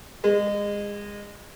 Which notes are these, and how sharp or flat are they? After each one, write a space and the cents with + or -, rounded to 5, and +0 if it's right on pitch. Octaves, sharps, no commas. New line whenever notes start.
G#3 -25